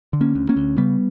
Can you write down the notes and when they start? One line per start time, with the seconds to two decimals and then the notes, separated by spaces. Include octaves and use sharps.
0.13 D3
0.21 A#3 C#4
0.35 D2
0.49 A#3 C#4
0.56 D2
0.77 C#3 G3 B3